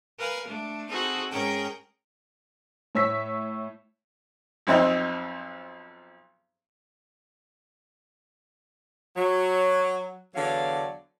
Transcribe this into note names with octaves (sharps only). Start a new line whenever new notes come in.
A#4 B4 F5 G#5
A3 D4
C4 D#4 F#4 G#4 A4
G#2 C#4 G#4 A#4 G5 A#5
A2 C#5 E6 B6
B1 F2 C4 D#4
F#3
E2 D3 F#3 B3 D5 F5